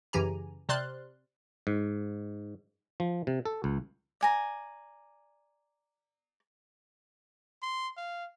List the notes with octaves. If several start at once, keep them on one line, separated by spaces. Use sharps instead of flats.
F#2 C#3 E3 G4 G#5 A#5
C3 C5 D5 C6 F6 F#6
G#2
F3
C3
A4
C#2
D5 G#5 A#5
C6
F5